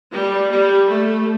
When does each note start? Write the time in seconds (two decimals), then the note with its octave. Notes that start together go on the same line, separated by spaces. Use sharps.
0.11 G3
0.50 G3
0.89 A3